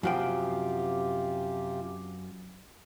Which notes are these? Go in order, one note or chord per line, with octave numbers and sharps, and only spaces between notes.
F#2 C3 F3 F4 G4 G5